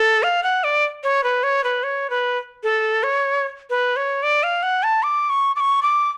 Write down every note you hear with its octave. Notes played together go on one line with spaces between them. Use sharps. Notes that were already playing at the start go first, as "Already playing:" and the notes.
Already playing: A4
F5
F#5
D5
C#5
B4
C#5
B4
C#5
B4
A4
C#5
B4
C#5
D5
F5
F#5
A5
D6
C#6
D6
C#6
D6